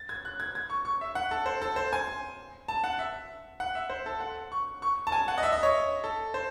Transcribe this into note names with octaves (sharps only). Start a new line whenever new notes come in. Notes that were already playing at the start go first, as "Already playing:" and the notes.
Already playing: A6
G#6
F#6
G#6
G#6
C#6
C#6
E5
F#5
A4
C5
A4
C5
G#5
A5
F#5
E5
F#5
E5
C5
A4
F#5
C#6
C#6
A5
G#5
F#5
D#5
E5
D#5
C#5
A4
C5